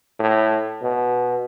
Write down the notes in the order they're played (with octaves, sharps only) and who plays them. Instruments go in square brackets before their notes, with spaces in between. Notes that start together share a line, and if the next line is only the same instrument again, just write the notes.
[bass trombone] A2
B2